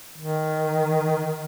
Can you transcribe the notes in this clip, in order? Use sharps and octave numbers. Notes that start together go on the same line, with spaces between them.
D#3